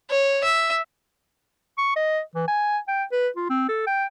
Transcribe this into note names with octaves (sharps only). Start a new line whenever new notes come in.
C#5
E5
C#6
D#5
E3
G#5
G5
B4
F4
C4
A4
G5